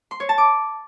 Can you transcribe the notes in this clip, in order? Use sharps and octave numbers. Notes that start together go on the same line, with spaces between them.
C6
C#5
A5
D6